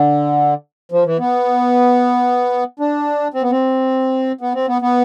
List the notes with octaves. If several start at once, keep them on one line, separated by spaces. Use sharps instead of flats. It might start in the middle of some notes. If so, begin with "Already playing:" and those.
Already playing: D3
F3
E3
B3
D4
C4
B3
C4
B3
C4
B3
B3